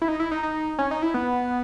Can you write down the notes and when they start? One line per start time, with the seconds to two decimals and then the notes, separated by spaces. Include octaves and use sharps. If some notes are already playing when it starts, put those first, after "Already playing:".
0.02 E4
0.08 D#4
0.20 E4
0.31 D#4
0.43 D#4
0.78 C#4
0.91 D#4
1.02 E4
1.14 B3